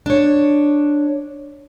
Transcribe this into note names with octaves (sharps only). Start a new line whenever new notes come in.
D4 C#5